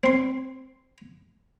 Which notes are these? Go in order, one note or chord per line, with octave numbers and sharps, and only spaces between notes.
C4 C6